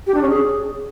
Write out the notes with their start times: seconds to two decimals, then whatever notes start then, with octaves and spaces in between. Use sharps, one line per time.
0.07 G4
0.14 D4
0.22 C#4
0.29 G#4